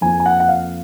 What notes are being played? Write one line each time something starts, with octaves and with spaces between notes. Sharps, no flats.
F2 F3 A#3 G#5
G#5
F#5
F#5
F5